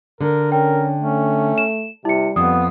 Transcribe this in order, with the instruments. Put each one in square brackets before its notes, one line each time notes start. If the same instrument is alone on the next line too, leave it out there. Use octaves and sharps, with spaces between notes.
[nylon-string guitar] D3 [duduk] A#4
[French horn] C#4 [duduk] A#4 [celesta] G5
[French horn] A3 [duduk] C#4
[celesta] E7
[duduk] C3 [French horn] G3 [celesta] E4 C#7
[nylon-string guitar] F2 [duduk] B3 [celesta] D#6